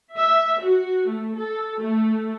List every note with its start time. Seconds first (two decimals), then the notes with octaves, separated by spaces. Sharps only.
0.14 E5
0.60 F#4
1.07 A3
1.37 A4
1.81 A3